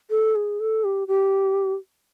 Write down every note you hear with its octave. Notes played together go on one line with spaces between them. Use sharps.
A4
G#4
A4
G4
G4